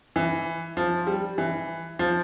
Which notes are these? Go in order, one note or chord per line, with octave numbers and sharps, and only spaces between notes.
E3
F3
G3
E3
F3